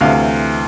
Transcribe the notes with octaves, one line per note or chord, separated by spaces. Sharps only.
D2 C3 E3 F5